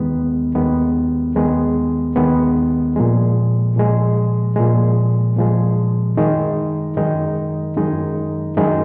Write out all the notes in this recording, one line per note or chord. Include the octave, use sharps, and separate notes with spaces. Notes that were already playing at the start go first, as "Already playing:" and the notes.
Already playing: D#2 D#3 G#3 B3
D#2 D#3 G#3 B3
D#2 D#3 G#3 B3
D#2 D#3 G#3 B3
A#2 F3 G#3
A#2 F3 G#3
A#2 F3 G#3
A#2 F3 G#3
F#2 D#3 G#3 D#4
F#2 D#3 G#3 D#4
F#2 D#3 G#3 D#4
F#2 D#3 G#3 D#4